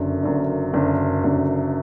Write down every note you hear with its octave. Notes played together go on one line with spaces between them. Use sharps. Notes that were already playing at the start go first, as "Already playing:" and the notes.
Already playing: F#1 F#2 D3
F#1 F#2 D3
F#1 F#2 D3
F#1 F#2 D3